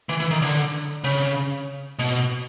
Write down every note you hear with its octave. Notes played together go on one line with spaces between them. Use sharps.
E3
E3
D#3
D3
C#3
B2